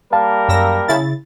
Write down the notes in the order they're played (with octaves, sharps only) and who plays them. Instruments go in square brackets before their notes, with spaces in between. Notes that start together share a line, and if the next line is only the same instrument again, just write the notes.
[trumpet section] G3 A#3 A#4 [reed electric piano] F5 A5
[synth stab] F#2 E6 A#6
C#3 E4 A6